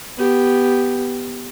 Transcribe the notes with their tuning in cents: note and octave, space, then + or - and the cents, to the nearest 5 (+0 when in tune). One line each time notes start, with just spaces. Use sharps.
B3 +0 G4 +0